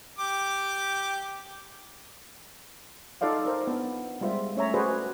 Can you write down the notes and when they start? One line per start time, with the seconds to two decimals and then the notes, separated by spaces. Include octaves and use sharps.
0.18 G4 D6
3.21 D#4 F4 A4 D5 F5 F#5
3.45 D#4 A#4 C5
3.67 B3 D4
4.21 G3 G#3 F4 C5 E5
4.55 A3 C#4 C#5 E5 A#5
4.74 F#4 G#4 A4 B4 C5 D5